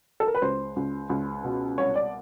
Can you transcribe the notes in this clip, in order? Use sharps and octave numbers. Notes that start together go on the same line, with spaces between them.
A4
A#4
B4
C#2 C5
C#2
C#2
B2
C2 C#5
D5